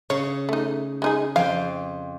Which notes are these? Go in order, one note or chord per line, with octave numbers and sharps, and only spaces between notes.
C#3 C#5
A3 D#4
G#3 D#4 G#4
F2 F5 G5